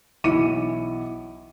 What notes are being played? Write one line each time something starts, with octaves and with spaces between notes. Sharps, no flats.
B1 E3 E4 D6 C#7 D#7